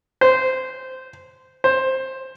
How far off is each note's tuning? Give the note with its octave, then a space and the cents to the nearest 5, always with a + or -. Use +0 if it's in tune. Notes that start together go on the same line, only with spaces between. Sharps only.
C5 -15
C5 +10